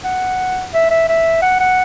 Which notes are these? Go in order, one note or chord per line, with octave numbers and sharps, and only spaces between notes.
F#5
E5
E5
E5
F#5
F#5